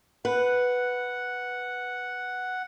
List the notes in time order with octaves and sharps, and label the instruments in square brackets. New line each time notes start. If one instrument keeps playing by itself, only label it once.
[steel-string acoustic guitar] B4 [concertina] F#5